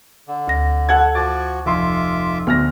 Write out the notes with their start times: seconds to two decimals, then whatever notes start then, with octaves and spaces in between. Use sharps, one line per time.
0.28 D3
0.48 D2 A#6
0.89 A4 F#5 G#6
1.15 F3 F#4 D6 A6
1.66 F1 F4 E5 C6 D6
2.47 D2 B3 F6 A#6